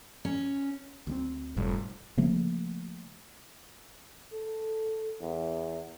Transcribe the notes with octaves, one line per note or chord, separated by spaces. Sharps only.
C#4
D2 G3 C4
F1 G#2 B2 G3
C#3 F3 A3 A#3
A4
E2